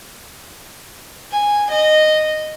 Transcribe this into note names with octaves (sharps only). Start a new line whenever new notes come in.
G#5
D#5